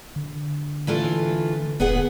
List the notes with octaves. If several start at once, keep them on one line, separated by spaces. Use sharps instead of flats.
D3
E3 A3 F4
E1 B3 G#4 F#5